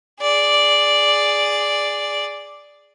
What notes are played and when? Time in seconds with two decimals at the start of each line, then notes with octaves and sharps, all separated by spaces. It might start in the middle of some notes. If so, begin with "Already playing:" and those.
0.22 G#4 D5